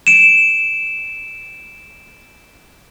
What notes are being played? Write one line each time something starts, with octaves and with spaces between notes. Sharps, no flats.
D7 E7